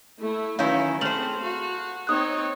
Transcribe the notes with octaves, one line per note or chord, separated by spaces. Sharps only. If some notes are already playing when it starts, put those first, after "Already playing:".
A3 E4
D#3 E3 F#3 C#4 E4 F5 G6
A3 C4 G#4 C5 F6 F7 F#7
F#4 F5
C4 D#4 C#5 D#6 F#6